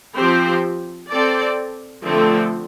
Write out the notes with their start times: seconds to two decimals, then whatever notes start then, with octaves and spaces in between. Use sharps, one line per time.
0.17 F3 C4 G4 C5
1.10 C4 A4 D5
2.03 D3 F3 A3 C4 A4